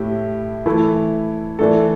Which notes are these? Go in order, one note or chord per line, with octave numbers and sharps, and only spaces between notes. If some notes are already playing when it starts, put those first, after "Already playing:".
Already playing: A2 A3 E4 G4
E3 A3 E4 A4
E3 A3 D4 A4